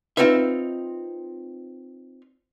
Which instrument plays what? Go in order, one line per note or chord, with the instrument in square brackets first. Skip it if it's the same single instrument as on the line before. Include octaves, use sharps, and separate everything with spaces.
[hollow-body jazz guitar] C4 D#4 F4 B4 E5